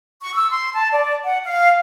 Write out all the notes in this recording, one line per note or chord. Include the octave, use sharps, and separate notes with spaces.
C#6
E6
C6
A5
D5
F#5
F5